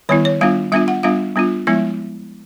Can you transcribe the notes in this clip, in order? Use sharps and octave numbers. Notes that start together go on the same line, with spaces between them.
D#3 G3 B3 E4 C#5
C#5
G3 B3 D4 F4 F5
G3 B3 D4 F4 E5
F#5
G3 B3 D4 F4 F5
G3 B3 D4 F4
F3 G#3 B3 E4 E5